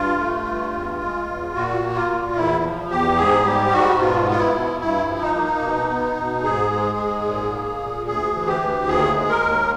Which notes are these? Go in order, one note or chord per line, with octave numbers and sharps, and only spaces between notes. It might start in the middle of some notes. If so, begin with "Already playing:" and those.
Already playing: G2 F4
A3
G2
E2
G#3
E2
A#2 F#4
A#3
F4
A#2
E2 E4
F3
E2 G4
G#2 G#4
G3 G4
G#2 F#4
B2 F4
B3 F4
E4
B2
G2 E4
F3
D#4
A#3
B2
B3
B2
G#2 G#4
G#3
G#2
A#2
A#3
A#2
D2 G#4
E3
G4
D2
D#2 G#4
G#3
A#4
D#2